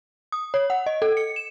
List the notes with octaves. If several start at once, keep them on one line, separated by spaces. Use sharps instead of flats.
D#6
C#5
F#5
D#5
A4
C#7
E7